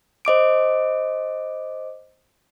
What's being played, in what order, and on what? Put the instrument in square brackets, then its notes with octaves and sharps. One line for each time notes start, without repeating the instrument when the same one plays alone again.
[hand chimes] C5 D#5 D6 D7